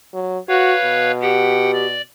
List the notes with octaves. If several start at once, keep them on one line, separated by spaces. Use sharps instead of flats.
F#3
F#4 B4 C#5 F5
B2
G4 F#5 G5
D5